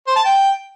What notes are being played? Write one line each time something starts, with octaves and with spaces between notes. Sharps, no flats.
C5
A5
G5